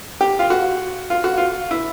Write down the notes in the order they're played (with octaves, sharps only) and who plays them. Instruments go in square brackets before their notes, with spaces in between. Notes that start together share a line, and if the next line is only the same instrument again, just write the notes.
[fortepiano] G4
F4
F#4
F4
F#4
F4
E4